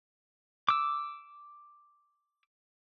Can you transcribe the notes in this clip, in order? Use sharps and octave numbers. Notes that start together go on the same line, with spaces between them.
D6 E6